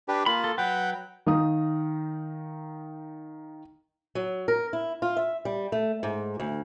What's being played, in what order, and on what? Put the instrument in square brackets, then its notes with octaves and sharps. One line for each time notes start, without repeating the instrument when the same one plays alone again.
[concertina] D4 G4 B4
[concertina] A#3 F4 [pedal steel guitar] B5
[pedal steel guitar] A4
[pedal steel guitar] F#3 B4 [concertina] F#5 G5
[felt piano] D#3 D#4 F5 D#6
[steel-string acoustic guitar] F#3
A#4
E4
F4
E5
G3
A3
G#2
D2